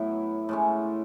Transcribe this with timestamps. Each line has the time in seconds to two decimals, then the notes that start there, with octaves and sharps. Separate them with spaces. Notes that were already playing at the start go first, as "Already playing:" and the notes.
Already playing: A2 F#3 B3 E4
0.49 A2 G#3 C#4